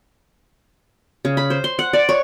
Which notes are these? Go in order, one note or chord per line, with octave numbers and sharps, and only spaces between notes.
C#3
B5
C5
C6
F#5
D5
C#5